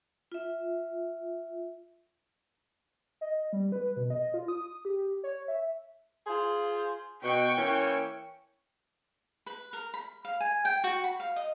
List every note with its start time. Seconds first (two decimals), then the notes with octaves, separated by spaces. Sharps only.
0.32 F4 E5
3.21 D#5
3.53 G3
3.72 B4
3.96 B2
4.10 D#5
4.34 F4
4.48 D#6
4.85 G4
5.24 C#5
5.48 E5
6.26 F4 G#4 C5
7.23 B2 G5 C#6
7.56 E3 A#3 C#4
9.46 B4
9.73 A#4
9.94 B5
10.25 F5
10.40 G#5
10.65 G5
10.84 F#4
11.04 B5
11.20 F5
11.36 D#5